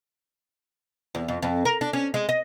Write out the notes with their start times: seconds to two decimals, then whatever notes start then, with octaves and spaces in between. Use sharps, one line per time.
1.15 E2
1.28 F2
1.43 F2
1.65 A#4
1.81 D4
1.93 C#4
2.14 G#3
2.29 D#5